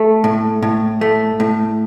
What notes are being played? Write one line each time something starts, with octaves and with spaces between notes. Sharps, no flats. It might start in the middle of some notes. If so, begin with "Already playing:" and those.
Already playing: A3
A2
A2
A3
A2